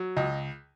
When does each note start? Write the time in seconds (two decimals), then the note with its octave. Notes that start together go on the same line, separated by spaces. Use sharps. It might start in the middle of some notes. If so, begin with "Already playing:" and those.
Already playing: F#3
0.17 C#2 D#5